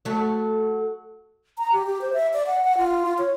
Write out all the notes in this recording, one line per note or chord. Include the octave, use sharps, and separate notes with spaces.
F#3 A3
A#5
G4
G4
C5
E5
D5
F#5
F#5
F4
F4
C#5